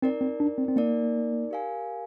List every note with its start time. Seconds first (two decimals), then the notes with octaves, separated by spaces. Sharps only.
0.02 C4 D#4 A#4 D5
0.21 C4
0.40 D4
0.58 C4
0.68 C4
0.76 A#3 D#4 A#4 D5
1.51 G4 A#4 F5 G#5